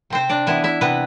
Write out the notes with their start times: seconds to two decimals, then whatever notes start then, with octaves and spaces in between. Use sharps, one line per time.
0.10 C3 C4 C5
0.29 D4 D5
0.47 E3 B3 E4 E5
0.64 E4 E5
0.81 C3 B3 B4